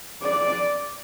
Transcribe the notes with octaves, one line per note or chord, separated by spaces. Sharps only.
D5